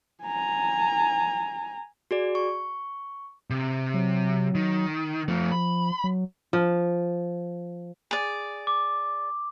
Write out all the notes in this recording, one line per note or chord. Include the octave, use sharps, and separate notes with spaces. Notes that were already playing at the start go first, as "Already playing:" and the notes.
G#5 A#5
F#4 G#4 D5
C#6
C3
F#3
D#3
F3 A3 F4
B5
F#3
F3
G#4 D5
D6